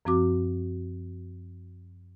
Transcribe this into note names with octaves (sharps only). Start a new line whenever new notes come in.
F#2 F3 C4 F#4 D6